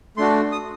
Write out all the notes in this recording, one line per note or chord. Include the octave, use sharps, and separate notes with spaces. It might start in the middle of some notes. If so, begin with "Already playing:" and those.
A3 D4 F#4 C6
D#6